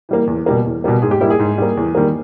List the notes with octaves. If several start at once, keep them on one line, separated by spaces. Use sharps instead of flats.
E3 G3 A#3
E2
B2 G3 A#3
E2
B2 G3 A#3
G#2 G#4
G4
G3 A#3 E4
G#4
G#2
G3 A#3
E2
D#3 G3 A#3